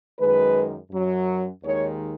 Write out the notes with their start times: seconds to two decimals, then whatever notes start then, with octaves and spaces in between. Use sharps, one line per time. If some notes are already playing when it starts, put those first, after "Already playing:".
0.19 F#2 D#3 G#3 B4
0.91 F#2 F#3
1.63 D#2 D#3 G#3 C#5